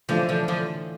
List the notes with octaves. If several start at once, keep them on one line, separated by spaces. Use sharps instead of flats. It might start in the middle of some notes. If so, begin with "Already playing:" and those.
A2 D3 E3 F3 A3 D4 F4
D3 F3
D3 F3